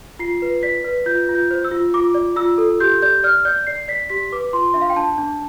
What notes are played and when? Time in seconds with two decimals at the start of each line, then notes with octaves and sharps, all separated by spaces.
0.19 F4 C7
0.42 B4
0.63 D5 B6
0.84 B4
1.06 F4 G6
1.29 F4
1.35 G6
1.51 C5
1.64 E6
1.72 F4
1.94 F4 D6
2.14 D5
2.36 F4 E6
2.58 A4
2.80 G4 G6
3.02 D5 G6
3.24 D5 F6
3.45 D5 G6
3.67 D5 C7
3.88 D5 B6
4.10 G4 B6
4.32 B4 D6
4.53 F4 C6
4.74 D4 E5
4.81 F5
4.90 G5
4.96 D4 A5
5.18 D4